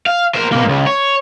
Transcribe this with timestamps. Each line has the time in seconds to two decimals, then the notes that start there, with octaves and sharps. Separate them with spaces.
0.06 F5
0.35 A#4 C5
0.52 B2 A#3
0.64 C#2 G#2
0.86 C#5